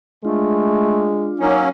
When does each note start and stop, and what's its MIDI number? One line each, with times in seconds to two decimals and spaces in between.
0.25 1.34 56
0.25 1.13 57
0.25 1.48 62
0.25 1.48 65
1.40 1.69 54
1.40 1.69 58
1.40 1.69 61
1.40 1.64 63